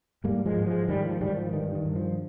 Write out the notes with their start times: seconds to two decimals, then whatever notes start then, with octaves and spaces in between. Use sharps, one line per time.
0.24 G#2 G3 A#3
0.46 F3 G#3
0.57 G#2
0.67 F3 G#3
0.88 G#2 D#3 G3
1.05 F3
1.21 G#2 D#3 G3
1.37 F3
1.53 G2 D#3
1.75 D#3
1.85 G2
1.95 F3